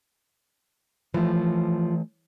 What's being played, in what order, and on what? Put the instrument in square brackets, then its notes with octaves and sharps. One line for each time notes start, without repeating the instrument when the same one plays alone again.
[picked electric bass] E3 A3 [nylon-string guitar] F3